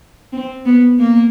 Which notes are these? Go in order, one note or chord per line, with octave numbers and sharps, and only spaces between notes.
C4
B3
A#3